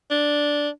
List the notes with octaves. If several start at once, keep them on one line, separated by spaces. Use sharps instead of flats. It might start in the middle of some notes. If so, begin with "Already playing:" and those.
D4